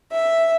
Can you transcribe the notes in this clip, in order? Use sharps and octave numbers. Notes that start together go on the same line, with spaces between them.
E5